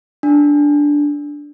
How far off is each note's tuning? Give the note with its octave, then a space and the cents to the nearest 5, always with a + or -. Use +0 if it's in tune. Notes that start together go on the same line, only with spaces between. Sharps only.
D4 -5